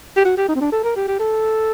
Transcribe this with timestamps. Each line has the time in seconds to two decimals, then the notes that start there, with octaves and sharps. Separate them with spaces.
0.17 G4
0.25 F#4
0.37 G4
0.48 D#4
0.56 C4
0.61 D4
0.72 A4
0.84 A#4
0.96 G4
1.08 G4
1.19 A4